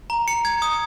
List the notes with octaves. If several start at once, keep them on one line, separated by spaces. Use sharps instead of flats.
A#5
C#7
G#6
D#6